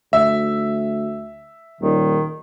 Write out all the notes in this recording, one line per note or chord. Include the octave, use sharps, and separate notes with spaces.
D2 E5
D#1 D#3